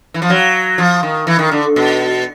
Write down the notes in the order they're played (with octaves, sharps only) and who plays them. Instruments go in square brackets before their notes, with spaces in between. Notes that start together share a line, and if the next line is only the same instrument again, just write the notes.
[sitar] E3
F3
F#3
F3
D#3
E3
D#3
D3
B2